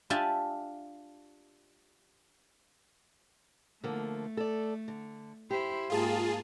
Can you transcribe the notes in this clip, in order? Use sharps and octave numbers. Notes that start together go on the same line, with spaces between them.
D4 F4 G4 E5 G#5 A5
D3 F3 A3 A#3
A4 D5
D3
E4 G4 C5
G#2 A#3 F4 G#4 A5